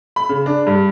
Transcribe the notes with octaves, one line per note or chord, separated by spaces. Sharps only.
B5
C#3
D4
G2